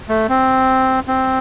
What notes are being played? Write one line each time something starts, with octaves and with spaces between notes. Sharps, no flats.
A3
C4
C4